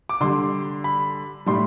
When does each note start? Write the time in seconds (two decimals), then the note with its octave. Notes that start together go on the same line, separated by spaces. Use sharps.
0.09 D6
0.21 D3 G3 C6
0.84 B5
1.46 A2 G3 C6